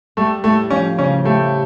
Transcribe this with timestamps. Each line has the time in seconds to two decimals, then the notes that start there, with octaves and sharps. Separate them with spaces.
0.17 G3 A3
0.44 A2 A3
0.70 F3 C#4
0.97 C#3 C#4
1.25 A3 G4